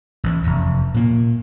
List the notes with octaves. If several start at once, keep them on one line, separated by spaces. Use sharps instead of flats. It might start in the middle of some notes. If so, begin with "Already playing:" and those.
A1 E3
F1 E2
A#2 A#3